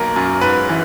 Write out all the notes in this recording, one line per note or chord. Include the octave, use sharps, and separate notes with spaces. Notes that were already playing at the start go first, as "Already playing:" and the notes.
Already playing: B1 A#3 A#4
F#2
G#2 B4
E3